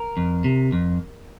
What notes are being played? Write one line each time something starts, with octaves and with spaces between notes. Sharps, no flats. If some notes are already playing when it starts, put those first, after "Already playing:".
Already playing: A#4
F2
C3
F2